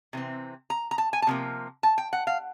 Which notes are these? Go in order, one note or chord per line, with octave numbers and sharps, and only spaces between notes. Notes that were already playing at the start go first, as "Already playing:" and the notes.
C3 E3 C4
A#5
A#5
A5
G#5
A5
C3 F3 A#3
A5
G5
F#5
F5